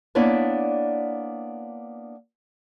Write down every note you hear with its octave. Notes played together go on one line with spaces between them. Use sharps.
A#3 B3 D4 E4 C#5 D5